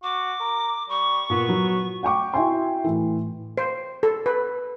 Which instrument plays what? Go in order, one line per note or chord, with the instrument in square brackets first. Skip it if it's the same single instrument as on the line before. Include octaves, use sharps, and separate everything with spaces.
[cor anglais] F#4 [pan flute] D6
[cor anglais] A#4
[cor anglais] G3 [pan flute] C#6
[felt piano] A#2 [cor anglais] B3
[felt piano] F#3
F#5 G5 C#6 D6
E4 F#4 E5 G5 G#5 C6
A2 E3
[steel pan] C5
A4
B4